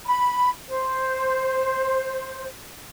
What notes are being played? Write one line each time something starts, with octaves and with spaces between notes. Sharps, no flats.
B5
C5